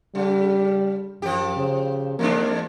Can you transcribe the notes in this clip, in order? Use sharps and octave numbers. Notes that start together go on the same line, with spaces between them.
C#3 G3
F#2 F3 G4
C#3
E2 G#2 A#3 D4